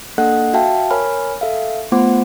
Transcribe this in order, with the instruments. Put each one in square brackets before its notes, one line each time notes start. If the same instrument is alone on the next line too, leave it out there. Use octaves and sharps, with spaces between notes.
[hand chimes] A#3 D4 A4 D#5 F#5 F#6
F#4 E5 F5 G5 A5
A#4 C#5 G#5 B5 F6
A4 E5 F5
A3 B3 F4 C5 F#5 D6